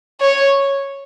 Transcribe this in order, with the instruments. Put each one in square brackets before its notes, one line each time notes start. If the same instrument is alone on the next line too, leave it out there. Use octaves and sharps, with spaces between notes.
[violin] C#5